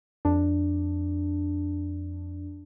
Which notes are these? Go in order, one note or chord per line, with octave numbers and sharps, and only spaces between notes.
F2 D4